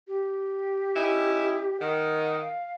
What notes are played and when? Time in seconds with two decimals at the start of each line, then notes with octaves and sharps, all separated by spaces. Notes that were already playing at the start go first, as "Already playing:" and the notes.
0.08 G4
0.95 C#4 D#4 E4
1.80 D#3 F#5
2.41 F5